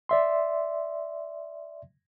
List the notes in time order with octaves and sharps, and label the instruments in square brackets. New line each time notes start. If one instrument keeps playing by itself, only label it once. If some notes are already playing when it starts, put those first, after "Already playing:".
[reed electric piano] D5 E5 C6